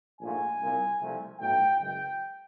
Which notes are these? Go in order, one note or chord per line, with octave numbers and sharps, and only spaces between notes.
A#1 G#2 F3 A3 G#5
C2 A#2 G3 A#3
C2 C3 F3 A3
B1 A2 F#3 A3 G5
F#2 C#3 E3 G#3 G5